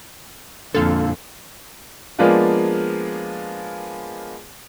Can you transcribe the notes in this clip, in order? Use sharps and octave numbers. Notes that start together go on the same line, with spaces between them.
F2 A#2 D3 A4 F5
F3 G#3 A#3 B3 D4 F4